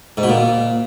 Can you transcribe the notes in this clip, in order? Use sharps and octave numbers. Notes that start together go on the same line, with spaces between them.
G#2
B2
A#2